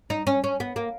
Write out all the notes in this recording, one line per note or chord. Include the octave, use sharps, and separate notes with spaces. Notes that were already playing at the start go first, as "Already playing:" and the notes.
D#4
C#4
C#4
B3
A#3